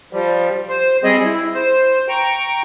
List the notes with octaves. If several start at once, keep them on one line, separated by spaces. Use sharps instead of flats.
F3 G3
C5
G3 C4 G#4 D#5
E4
C5
G5 A#5 C#6